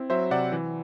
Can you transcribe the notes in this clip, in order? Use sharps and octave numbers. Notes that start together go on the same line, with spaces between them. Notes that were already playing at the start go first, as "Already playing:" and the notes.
Already playing: C4 E4
F#3 C5 E5
C3 D5 F#5
E3